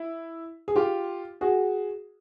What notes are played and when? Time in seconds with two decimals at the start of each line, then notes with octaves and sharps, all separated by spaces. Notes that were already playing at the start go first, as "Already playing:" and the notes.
Already playing: E4
0.68 G#4
0.76 F4 G4
1.41 F#4 G#4